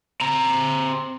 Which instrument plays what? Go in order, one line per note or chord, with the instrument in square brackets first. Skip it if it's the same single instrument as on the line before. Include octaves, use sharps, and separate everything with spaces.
[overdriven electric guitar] C4 A#5